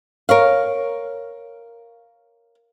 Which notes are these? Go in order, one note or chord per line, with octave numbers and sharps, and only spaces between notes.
A#4 C#5 F5